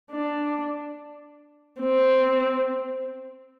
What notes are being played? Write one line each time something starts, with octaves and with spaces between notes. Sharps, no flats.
D4
C4